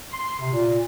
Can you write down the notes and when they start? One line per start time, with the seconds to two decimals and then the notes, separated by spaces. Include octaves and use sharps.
0.12 C6
0.40 C3
0.52 A#2